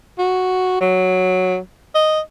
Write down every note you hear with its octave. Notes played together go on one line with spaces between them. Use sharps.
F#4
F#3
D#5